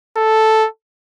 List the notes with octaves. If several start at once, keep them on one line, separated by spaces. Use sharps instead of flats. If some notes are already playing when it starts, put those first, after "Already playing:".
A4